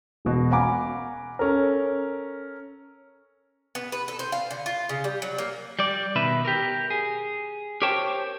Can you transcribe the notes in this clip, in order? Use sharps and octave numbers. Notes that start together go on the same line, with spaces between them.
E1 B2
F5 F#5 G#5 A#5 B5 D6
C#4 A4 A#4
B3
B4
A4
C5
F5
D3
F4
C#3
G3
F#3
A#3
G3 D5
B2 D#3 B4 E5
G4 A#4
G#4
G4 A#4 C5 C#5 G5 A5